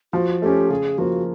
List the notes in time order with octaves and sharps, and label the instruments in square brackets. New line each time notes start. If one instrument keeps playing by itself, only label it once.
[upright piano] F3 [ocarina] F#4
[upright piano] A3 C#4 [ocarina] G4
[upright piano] C#3 [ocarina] G#4
[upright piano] F3 A#3 [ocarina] F#4